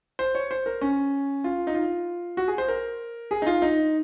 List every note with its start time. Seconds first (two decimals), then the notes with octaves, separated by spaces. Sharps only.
0.19 C5
0.35 C#5
0.51 C5
0.66 A#4
0.81 C#4
1.44 F4
1.67 D#4
1.75 F4
2.37 F#4
2.48 G#4
2.58 C5
2.68 A#4
3.31 G#4
3.42 D#4
3.47 F4
3.62 D#4